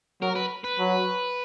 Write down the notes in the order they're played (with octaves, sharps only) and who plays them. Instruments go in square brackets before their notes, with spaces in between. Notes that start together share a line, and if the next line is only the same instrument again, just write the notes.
[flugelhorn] F#3 [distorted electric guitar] A#4
[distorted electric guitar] B4
B4
[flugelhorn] F#3